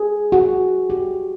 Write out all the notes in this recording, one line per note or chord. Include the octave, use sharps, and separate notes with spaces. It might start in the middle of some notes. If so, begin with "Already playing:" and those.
Already playing: G#4
F#4
G4